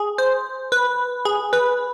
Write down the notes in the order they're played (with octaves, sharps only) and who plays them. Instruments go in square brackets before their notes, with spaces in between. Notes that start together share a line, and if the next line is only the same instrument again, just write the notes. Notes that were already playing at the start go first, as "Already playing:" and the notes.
Already playing: [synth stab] G#4
C5
B4
G#4
B4